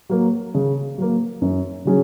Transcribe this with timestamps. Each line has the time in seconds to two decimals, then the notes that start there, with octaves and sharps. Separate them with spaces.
0.09 F#3 A#3
0.54 C#3
0.98 F#3 A#3
1.41 F#2
1.85 C#3 F#3 C#4 G#4